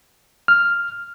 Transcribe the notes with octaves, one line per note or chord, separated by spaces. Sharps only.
F6